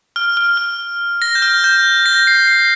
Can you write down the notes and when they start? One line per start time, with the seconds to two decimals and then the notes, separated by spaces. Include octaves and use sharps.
0.16 F6
0.37 F6
0.57 F6
1.22 A#6
1.35 G6
1.42 F6
1.64 G6
2.06 A#6
2.27 C7
2.48 C7